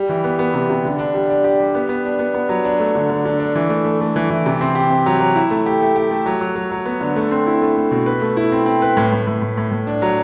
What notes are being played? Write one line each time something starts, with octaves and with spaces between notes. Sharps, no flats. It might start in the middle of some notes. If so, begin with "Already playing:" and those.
Already playing: G3
E3
B3
B3
C3
C3
D3
D4
G3
D4
G4
G3
B3
B3
D4
B3
B3
F#3
D4
A3
D3
D3
D3
D4
E3
A3
A3
A3
E3
E3
C3
C4
G4
C4
F#3
F#3
E4
A3
G4
A3
G4
A3
F#3
F#3
F#3
F#3
B3
D3
A3
C4
E4
A3
A3
B2
B4
A3
E4
C4
C4
B4
A2
A2
A2
A2
A2
A2
D4
F#3